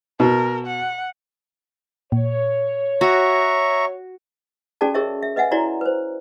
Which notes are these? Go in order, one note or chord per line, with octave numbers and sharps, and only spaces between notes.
B2 A#4
F#5
A#2 C#5
F#4 E5 A#5 C#6
C#4 F#4 G#4 A4 D5 A5
G#4 A#4 C#5 D#5 E5 C#6
E5
B4 D#5 E5 F#5 G#5
E4 F#4 C#5 D5 A#5
B4 C5